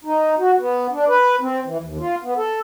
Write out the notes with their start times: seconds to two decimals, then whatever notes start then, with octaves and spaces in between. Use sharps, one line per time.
0.05 D#4
0.39 F#4
0.59 B3
0.92 D4
1.09 B4
1.41 C4
1.65 E3
1.82 D#2
2.00 F4
2.23 B3
2.37 A4